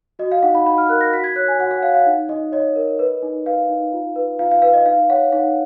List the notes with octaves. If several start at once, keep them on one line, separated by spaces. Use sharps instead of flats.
F#4 D#5
F5
D#4 F#5
B5
D#4 B5
F6
A#4 F#6
A#6
F#4 B6
G#6
C#5 F#6
G#5
F#4 F#5
F#5
C#5 F5
F5
D#4
D#4 D#5
C#5 D#5
A#4
B4
D#4
B4 F5
D#4
F4
B4
F4 F5
F5
B4 F5
D#5
D#4 F5
C#5 F#5
D#4 F#5